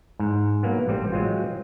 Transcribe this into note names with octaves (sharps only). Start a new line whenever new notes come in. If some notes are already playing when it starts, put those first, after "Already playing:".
G#2
F#3 A#3 B3
A1 G3 C4
F#3 G#3 C4 F4